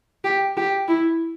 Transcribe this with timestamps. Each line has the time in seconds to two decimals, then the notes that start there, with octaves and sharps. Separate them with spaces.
0.24 G4
0.57 G4
0.88 E4